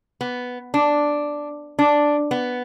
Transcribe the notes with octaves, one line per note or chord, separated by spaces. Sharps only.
B3
D4
D4
B3